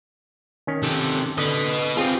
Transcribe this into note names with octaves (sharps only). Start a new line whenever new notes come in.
D#3 C#4
C3 A4
D3 B4 D#5
C4 F4 G4 G#4